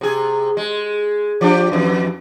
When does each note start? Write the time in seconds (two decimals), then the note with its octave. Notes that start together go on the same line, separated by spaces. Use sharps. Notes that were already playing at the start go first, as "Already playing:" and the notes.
0.01 C3 G#4
0.57 G#3
1.41 F3 D4 G4
1.71 F2 E3